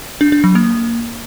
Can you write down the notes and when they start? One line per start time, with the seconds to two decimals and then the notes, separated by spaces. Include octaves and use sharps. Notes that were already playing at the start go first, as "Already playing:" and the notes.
0.21 D4
0.32 D4
0.44 F#3
0.55 A#3